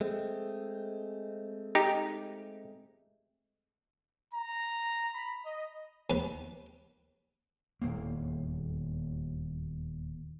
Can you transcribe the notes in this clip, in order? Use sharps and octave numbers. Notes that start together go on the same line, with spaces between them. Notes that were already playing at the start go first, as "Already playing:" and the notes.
G#3 A3 C4
D#4 G4
A#5
B5
D#5
D#2 B4
D#1 E2 A#3